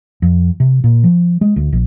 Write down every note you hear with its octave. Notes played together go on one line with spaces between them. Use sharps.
F2
C3
A#2
F3
G#3
D2
A#1